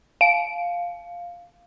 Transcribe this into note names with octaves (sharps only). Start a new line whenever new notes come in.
F5 D7